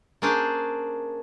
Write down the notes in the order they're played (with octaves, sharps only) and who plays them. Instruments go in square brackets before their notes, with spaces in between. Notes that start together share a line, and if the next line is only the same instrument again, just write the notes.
[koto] A#3 C#4 D4 G#4 C5 D5